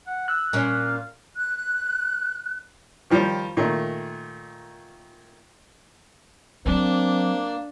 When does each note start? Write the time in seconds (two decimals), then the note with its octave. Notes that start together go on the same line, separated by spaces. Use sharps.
0.07 F#5
0.28 E6 F#6
0.53 A#2 C#4 F5
1.37 F#6
3.10 D#3 F3 G3
3.57 A#2 D#3 A3
6.66 F#3 A#3 C4 D4